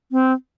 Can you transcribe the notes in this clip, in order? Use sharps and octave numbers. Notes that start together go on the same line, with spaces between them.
C4